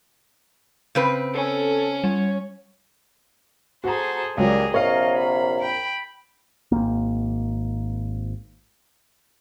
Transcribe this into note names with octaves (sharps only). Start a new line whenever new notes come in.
C#3 C4 B4
C#4 A4
G3 C#5
F#4 G#4 A4 C5 A#5
C#2 A#2 F#3 G3 G#4 A#4
A#1 C3 A#4 C#5 D#5 F5
B5
G5 B5
G#1 F2 A#3